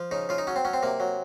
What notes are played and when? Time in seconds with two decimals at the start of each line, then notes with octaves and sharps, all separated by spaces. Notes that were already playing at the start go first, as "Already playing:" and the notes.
Already playing: F3
0.11 C#3 D#4
0.29 C#3 F4
0.38 D#4
0.47 F#3 C#4
0.56 C4
0.65 F#3 C#4
0.73 C4
0.83 C3 A#3
1.00 F#3